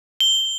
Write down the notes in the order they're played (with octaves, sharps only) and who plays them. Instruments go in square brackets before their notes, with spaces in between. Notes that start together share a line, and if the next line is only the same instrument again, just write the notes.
[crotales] G7